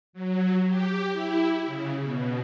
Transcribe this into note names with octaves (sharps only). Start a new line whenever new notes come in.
F#3
G4
E4
C#3
B2